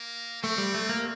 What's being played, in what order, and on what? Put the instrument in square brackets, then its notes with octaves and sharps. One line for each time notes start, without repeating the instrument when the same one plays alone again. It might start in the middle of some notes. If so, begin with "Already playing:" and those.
Already playing: [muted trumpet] A#3
[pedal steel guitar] A3 [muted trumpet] C4
[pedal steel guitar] G3
A3
A#3